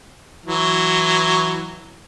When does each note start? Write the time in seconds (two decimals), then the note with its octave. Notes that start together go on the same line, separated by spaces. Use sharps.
0.46 E3 F#3